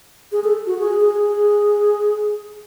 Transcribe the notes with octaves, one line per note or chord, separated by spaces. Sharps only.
G#4
A4
F#4
G#4
G#4
G#4